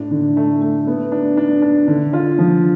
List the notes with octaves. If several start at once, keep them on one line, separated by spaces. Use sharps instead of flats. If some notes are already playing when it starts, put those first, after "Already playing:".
Already playing: A2 D4
D3
A3
A3
B3
D4
D4
D4
D3
F4
F3